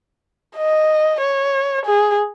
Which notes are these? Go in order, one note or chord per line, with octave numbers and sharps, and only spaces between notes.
D#5
C#5
G#4